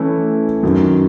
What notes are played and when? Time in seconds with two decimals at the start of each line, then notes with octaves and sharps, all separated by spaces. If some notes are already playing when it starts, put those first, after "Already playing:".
Already playing: E3 A3 C#4 E4
0.63 F#2 D#3 F#3